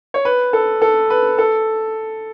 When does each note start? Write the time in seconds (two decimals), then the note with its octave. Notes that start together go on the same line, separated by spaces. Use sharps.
0.14 C#5
0.25 B4
0.53 A4
0.82 A4
1.10 B4
1.38 A4